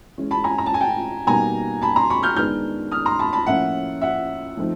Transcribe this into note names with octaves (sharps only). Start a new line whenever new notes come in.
E3 G#3 C#4
A5 B5
G#5 A#5
A#5
A5
G#5
G5 A5
B2 G3 A#3 D#4 G#5 A#5
A5 B5
A#5 C6
B5 C#6
F6 G6
D#3 G#3 B3 D4 F6 G6
D#6 F6
A#5 C6
A5 B5
A5 B5
A2 F3 A#3 C#4 E5 F#5
E5 F#5
F3 A3 C4 D#4